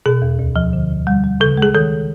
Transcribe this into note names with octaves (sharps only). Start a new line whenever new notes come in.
B2 G#4
E2
D2
F3
D3
D2
G3
G3
C#3 A4
G#3 G#4
D#3 A4